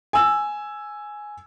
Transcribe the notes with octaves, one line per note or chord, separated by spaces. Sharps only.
G#5 E6